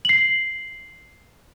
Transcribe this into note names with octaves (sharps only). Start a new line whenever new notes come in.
C7 F#7